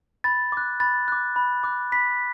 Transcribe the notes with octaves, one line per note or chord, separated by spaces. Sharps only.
B5 A6
D6 F#6
B5 A6
D6 F#6
B5
D6 F#6
B5 B6